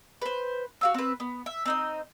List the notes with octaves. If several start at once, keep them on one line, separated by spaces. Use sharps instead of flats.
B4 C5
F#4 F5 E6
C4 B4
B3
E5
C4 D#4 D#5